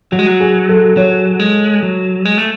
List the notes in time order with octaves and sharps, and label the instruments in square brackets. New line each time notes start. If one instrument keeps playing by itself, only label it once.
[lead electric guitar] F#3 [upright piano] F#4
[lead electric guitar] G#3
F#3
[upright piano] G#4
A4
[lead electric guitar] F#3 [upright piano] C#5
[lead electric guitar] G#3
F#3
G#3
A3